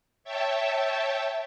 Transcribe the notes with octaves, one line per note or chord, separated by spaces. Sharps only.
C#5 E5 G5 A5